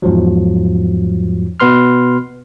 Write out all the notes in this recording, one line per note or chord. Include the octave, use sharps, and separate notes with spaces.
E2 G#2 F3 F#3
B2 B3 B4 C6 F6